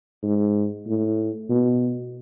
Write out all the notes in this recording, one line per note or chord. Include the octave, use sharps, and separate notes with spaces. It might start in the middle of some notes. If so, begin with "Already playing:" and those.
G#2
A2
B2